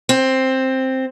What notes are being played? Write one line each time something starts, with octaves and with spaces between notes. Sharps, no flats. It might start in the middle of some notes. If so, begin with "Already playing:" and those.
C4